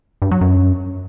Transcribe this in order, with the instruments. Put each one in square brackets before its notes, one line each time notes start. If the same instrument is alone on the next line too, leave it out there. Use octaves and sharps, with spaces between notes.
[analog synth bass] G2
F#3
F#2